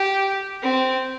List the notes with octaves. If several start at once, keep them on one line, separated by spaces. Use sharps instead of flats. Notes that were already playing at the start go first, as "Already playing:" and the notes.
Already playing: G4
C4